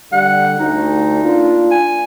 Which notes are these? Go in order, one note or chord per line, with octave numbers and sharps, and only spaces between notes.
D3 G3 F#5
D2 D#4
A#3 D4 F4
G#5